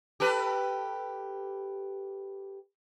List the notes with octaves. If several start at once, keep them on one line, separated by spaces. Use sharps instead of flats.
G4 A4 B4